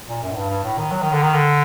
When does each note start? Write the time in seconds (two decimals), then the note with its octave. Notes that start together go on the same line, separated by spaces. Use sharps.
0.09 A#2
0.23 F#2
0.32 A2
0.37 G2
0.50 G2
0.64 A2
0.78 D#3
0.92 F#3
1.02 D#3
1.12 D3
1.22 D#3
1.34 D3